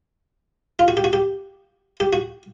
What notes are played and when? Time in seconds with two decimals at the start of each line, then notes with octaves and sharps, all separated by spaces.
0.79 F4
0.88 F#4
0.97 G4
1.04 F#4
1.13 G4
2.00 G4
2.13 F#4